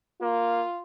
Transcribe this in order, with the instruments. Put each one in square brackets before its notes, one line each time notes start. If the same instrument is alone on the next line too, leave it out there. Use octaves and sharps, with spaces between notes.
[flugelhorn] A#3 [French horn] F4